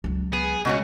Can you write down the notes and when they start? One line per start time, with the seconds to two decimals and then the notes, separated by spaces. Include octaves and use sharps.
0.04 C#2 F#3
0.33 B3 G#4
0.65 C#2 B2 F#4 C#5